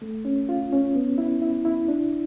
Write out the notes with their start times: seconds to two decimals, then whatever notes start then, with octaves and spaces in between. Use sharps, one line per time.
0.02 A3
0.25 C#4
0.49 F4
0.72 C#4
0.94 B3
1.18 E4
1.42 E4
1.65 E4
1.88 D4